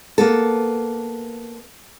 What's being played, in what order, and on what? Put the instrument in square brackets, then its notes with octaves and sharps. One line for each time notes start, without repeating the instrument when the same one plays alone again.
[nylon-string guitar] A#3 B3 A4